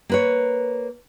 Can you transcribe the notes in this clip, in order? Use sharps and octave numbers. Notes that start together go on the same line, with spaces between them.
A#3 B4 C#5